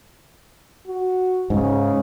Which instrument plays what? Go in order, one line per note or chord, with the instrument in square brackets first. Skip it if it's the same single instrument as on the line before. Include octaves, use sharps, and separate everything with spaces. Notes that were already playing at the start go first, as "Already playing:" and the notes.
[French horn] F#4
[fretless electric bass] G#2 [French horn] C#3